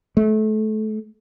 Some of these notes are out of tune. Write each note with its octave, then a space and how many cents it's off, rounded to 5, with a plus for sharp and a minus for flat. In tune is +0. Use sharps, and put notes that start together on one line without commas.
A3 -25